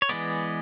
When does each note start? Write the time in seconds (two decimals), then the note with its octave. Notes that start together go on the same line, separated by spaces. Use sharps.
0.02 C#5
0.09 E3 G#3 B3 D5